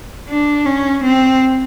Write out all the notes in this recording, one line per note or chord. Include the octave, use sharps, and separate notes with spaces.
D4
C#4
C4